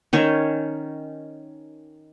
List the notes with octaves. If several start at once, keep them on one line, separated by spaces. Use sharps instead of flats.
D#3 C#4 C#5